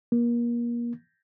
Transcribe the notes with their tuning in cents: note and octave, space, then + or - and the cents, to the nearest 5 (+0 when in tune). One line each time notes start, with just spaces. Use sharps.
A#3 +30